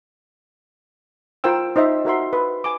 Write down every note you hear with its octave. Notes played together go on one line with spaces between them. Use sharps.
F4 A#4 C5 G5 E6
D#4 C5 D#5 E5
F#4 A#4 E5 C6
B4
G#5 D6